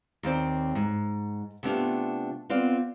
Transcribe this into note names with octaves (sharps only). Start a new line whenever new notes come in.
D#2 C4 C5 D5
G#2
C3 A3 B3 C4 D4 F4
B3 C4 F4 D5